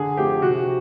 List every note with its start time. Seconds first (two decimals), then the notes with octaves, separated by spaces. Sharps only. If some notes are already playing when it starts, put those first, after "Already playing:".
Already playing: D3 G#4
0.17 F3 A3 C4 G4
0.42 C3 F#4